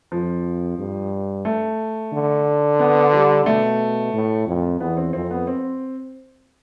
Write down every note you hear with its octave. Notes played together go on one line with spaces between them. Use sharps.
F2 F3
G2
A3
D3
B3
G3
B2 A3
A2
F2
E2 B3
C4
F2 C4
B3
C4